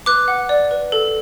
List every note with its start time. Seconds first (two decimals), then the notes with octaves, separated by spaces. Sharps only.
0.06 B4 D6 F#6
0.28 F#5
0.49 D5
0.71 B4
0.92 A4